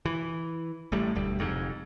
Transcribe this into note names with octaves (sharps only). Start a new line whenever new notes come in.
E3
A1 A2 G3
E1 D2 G3
F1 F2 G#2